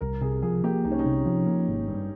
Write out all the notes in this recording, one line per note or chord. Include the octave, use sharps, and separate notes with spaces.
C2 A#4
C3 G#4
F3 G#4
A#3 G4
C2 D#4
C#4
D#4
C3
F3
A#3
G#1
G2